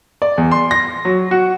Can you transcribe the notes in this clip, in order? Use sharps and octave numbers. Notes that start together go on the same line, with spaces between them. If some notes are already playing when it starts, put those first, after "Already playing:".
D5
E2
C6
A#6
F#3
F#4